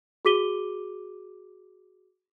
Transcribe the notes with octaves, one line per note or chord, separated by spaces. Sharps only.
F#4 G#4 D6 B6 D#7 G7